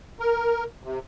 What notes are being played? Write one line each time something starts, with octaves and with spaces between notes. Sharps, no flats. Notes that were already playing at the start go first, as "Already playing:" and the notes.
A#4
C3